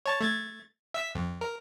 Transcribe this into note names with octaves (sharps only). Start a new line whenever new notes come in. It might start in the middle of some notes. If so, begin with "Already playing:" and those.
C#5 A5 A6
A3 G#6 A6
E5 E6 B6
F2
A#4